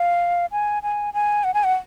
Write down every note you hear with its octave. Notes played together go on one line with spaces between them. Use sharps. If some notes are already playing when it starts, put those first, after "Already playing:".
Already playing: F5
G#5
G#5
G#5
F#5
G#5
F#5